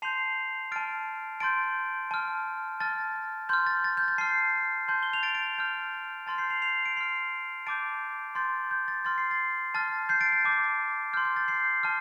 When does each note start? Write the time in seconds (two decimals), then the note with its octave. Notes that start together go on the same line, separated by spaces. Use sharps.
0.02 A5 C6 G6 C7 F7
0.72 A5 F6 A6 D7
1.40 A5 C6 G6 A6 D7
2.11 A5 F6
2.80 A5 F6 A6
3.49 C6 F6 G6
3.66 A6
3.84 A6
3.97 G6
4.08 A6
4.18 A5 F6 G6 C7
4.88 A5 C6 G6
5.03 G7
5.13 F7
5.23 A6 D7
5.35 A6 D7
5.58 A5 F6 G6
6.27 A5 C6 F6 A6
6.38 G6 C7
6.50 C7 F7
6.62 C7 F7
6.85 D7
6.96 C6 F6 C7 F7
7.66 A5 D6 G6 A6 D7
8.35 C6 G6 A6
8.71 G6
8.88 A6
9.05 C6 F6 A6
9.18 C7
9.31 A6
9.74 A5 F6 A6
10.09 G6 C7
10.21 A6 D7
10.32 A6
10.45 A5 D6 G6
11.13 C6 F6 G6
11.25 G6
11.36 A6
11.48 G6 C7
11.83 A5 F6